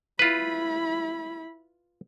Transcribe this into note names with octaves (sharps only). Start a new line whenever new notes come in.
E4 F4 B4 B5